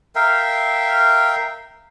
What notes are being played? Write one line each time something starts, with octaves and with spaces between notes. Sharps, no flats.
A#4 E5 F5 G5